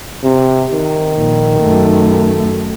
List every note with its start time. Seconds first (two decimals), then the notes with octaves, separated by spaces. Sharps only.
0.23 C3
0.73 D#3
1.17 A#1
1.61 F#2 A3